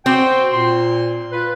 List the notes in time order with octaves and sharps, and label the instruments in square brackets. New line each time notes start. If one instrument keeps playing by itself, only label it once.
[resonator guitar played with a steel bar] C4 [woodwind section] F#4 C5 G5
[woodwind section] A#2 C6
F4 B4